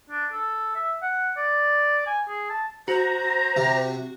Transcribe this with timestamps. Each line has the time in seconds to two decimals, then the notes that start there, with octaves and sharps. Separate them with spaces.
0.10 D4
0.33 A4
0.75 E5
1.02 F#5
1.37 D5
2.07 G#5
2.28 G#4
2.50 A5
2.88 F#4 C5 A#5
3.57 C3